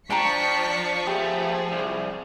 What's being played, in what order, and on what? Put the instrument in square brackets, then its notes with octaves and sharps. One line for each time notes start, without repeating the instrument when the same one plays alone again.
[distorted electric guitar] F3 [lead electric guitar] D4 [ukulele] G5 A5 A#5 [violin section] C#6 B6 C#7
[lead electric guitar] A3 B3 [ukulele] G4 [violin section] G#4
[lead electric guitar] C2